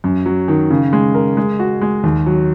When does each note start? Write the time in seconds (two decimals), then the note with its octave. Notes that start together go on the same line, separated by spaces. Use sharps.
0.04 F#2
0.26 F#3
0.48 D#3
0.70 C#3
0.93 G#3
1.14 A#4
1.37 G#3
1.59 F#4
1.81 G#3
2.04 D#2
2.26 F#3